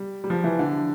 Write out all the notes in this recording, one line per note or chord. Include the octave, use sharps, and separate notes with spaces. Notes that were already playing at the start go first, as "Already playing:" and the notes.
Already playing: G3
G3
F3
E3
D3